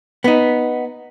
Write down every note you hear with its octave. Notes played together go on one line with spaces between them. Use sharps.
B3 D#4